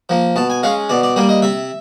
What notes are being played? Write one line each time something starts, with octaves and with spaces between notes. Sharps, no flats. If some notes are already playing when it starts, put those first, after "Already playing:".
F3 A#3
B2 A5
G#5
G#3 C#4 F5
B2 D5
D5
G3 A#3 D5
D#5
C3 E5